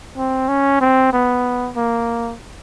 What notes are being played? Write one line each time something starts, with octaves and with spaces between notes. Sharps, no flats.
C4
C#4
C4
B3
A#3